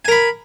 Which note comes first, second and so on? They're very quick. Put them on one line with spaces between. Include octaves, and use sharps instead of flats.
G#5 A#4 B5